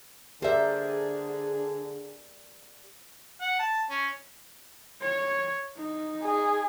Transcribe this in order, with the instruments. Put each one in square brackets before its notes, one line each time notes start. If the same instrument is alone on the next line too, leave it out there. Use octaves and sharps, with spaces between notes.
[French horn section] D3 G#4 [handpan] G4 A#4 D5 [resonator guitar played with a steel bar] C5 E5
[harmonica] F#5
A5
C#4
[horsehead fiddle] C#5
D#4
[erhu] G#4